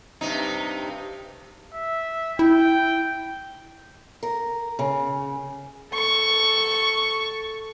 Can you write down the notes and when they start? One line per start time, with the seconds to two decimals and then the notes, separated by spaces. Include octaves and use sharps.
0.21 G2 C3 D#4
1.74 E5
2.39 E4 G5
4.23 A#4
4.79 C#3
5.91 A4 C#6